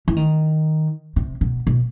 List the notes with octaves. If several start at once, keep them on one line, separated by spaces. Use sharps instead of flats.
E3
D#3
C3
B2
B2